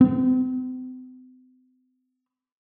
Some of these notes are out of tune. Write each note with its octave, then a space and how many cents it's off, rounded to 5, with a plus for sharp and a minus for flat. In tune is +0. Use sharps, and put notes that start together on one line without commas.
C4 -45